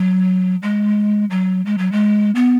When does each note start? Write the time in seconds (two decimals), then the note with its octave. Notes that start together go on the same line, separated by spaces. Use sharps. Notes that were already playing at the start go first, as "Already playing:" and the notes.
Already playing: F#3
0.63 G#3
1.30 F#3
1.66 G#3
1.78 F#3
1.92 G#3
2.35 B3